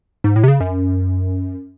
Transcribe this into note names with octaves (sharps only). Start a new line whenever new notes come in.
G#2
A2
C3
C#3
F#2